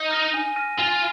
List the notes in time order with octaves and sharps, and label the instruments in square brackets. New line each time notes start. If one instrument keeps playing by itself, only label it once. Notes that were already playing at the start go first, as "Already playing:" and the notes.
Already playing: [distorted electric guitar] D#4
[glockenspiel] F6 A#6 D#7
G#5
F6 A#6 D#7
[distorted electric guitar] F4 [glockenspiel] G#5